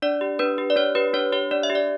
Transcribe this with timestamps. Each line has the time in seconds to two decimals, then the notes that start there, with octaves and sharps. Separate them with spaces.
0.02 D4 D5
0.21 G4
0.39 D4 B4
0.58 G4
0.70 D5
0.76 D4 C#5
0.95 G4 B4
1.14 D4 C#5
1.32 G4 C#5
1.51 D4 D5
1.63 E5
1.70 G4
1.75 D5